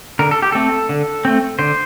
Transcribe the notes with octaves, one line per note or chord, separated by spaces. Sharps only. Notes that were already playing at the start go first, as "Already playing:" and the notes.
D3 A#4
A4
G4
A3 C4 A4
D3
A3 C4
D3 C5